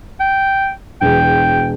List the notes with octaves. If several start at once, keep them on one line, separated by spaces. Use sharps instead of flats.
G5
E1 E2 G5